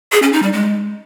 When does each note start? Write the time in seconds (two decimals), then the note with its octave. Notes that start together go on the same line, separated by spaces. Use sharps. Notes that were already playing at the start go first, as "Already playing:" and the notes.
0.12 G#4
0.22 C#4
0.32 D#4
0.42 G3
0.52 G#3